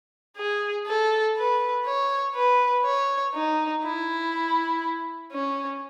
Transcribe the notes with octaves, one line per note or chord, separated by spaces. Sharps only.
G#4
A4
B4
C#5
B4
C#5
D#4
E4
C#4